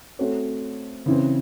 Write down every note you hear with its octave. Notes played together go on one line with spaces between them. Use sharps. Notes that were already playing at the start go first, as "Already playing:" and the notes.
A3 C4 F#4 A4 C#5
C#3 E3 C4